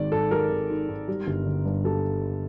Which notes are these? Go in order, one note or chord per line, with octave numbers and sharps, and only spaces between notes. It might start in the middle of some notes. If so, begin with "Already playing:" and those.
Already playing: G#1 D#3 G#3 D5
G#2 A4
G#3 A#4
G#1
D#3
G#2
G3
G1
D3
G2
G3 A4